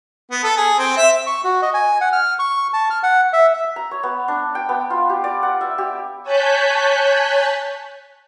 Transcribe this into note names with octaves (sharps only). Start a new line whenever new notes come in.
B3
A4
G#4
C4
E5
C#6
F#4
D#5
G#5
F#5
F6
C#6
A5
F6
F#5
E5
E5
A#5
C#5
B3
D4
G5
B3
F4
G4
D5
F#5
E5
G4
C#5 G#5 A5 F#6 G6 B6